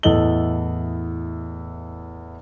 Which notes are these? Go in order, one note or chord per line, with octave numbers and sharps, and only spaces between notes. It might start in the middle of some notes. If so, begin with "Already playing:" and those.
E2 A2 A4 D#5 F#7 G7